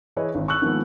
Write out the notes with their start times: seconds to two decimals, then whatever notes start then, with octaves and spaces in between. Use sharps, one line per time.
0.16 E3 E4 G#4 B4 C#5 D#5
0.35 G#1
0.48 C#6 E6 F#6 F#7
0.62 D#3 F3 G#3 A#3 B3